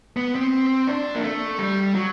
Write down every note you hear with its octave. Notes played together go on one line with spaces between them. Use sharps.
B3
C4
D4
A#3
A3
G3
F#3